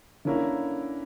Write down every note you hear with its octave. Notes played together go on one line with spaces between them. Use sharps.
D3 A#3 C#4 E4 A#4